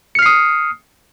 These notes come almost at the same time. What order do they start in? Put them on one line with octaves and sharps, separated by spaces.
C#7 F6 C7 D#6